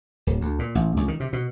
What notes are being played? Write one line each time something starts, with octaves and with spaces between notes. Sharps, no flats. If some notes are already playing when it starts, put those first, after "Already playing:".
D1
D2
A#2
A1
C#2
D#3
C3
B2